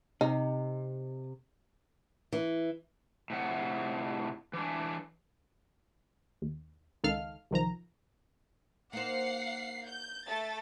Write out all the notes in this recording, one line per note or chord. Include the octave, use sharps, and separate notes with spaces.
C3 D#4
E3
A2 C3 F#5
E3 D4
D#2
C#2 D#3 D#4 A4 F5 F6
C2 D#3 F3 A#5
A#3 D#4 C5 F5 F#5 C7
G6
A3 A4 A6